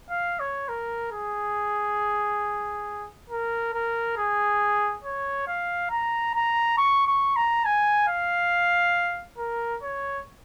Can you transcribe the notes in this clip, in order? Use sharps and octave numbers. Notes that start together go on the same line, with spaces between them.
F5
C#5
A#4
G#4
A#4
A#4
G#4
C#5
F5
A#5
A#5
C#6
C#6
A#5
G#5
F5
A#4
C#5